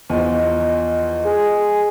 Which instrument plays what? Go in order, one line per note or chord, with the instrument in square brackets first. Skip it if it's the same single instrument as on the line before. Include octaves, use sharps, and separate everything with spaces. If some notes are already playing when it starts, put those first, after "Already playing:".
[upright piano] E2 F3 [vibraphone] D#5 C6 C#6
[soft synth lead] G#4